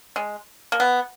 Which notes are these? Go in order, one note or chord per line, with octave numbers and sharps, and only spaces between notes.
G#3
A#3
B3